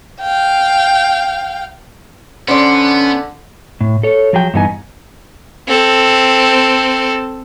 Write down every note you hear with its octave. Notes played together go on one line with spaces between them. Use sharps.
F5 G5
D3 B3 C#4 C5 D5
A2
A4 C#5
F3 F#3 G#4 G5
G2 E3 B3 D#4 G4 G#5
C4 A4